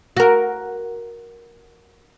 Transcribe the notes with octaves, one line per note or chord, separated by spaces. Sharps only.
F#4 A#4